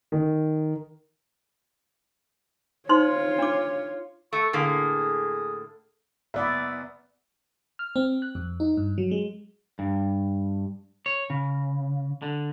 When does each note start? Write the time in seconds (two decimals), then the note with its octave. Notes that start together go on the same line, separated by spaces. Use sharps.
0.12 D#3
2.89 D#4 F4 C5 C#5 C6
3.38 D4 D6
4.33 A3 C#6
4.53 A2 D3 A#3 G#4
6.34 F#1 B3 D5 E5 B5
7.79 F6
7.96 C4
8.22 F#6
8.35 F2
8.60 D#4
8.77 G2
8.98 F#3
9.11 G#3
9.79 G2
11.06 C#5
11.30 C#3
12.22 D3